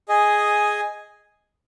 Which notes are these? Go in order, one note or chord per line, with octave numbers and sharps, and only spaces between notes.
G#4 D#5 G#5